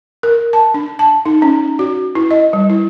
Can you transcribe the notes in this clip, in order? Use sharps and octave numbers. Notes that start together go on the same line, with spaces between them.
A#4
A5
D4
A5
D#4
C#4
F#4
E4
D#5
G3
E4